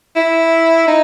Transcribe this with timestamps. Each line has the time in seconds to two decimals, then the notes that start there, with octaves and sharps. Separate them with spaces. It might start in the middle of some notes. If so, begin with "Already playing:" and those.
0.16 E4
0.88 D#4